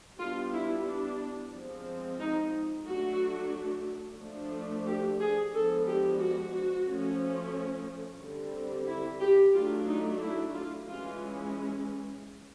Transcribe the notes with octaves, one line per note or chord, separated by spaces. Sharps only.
G3 B3 D4 F4
E4
D4
F3 G#3 C4
D#4
F#3 A3 D4 F#4
F3 A3 D4
G4
G#4
F3 G#3 B3 D4 A4
G4
F#4
F3 A3 C#4
D3 G3 C4
E4
G4
F#3 A3 D4 F4
D#4
E4
F4
E3 G#3 C#4 F4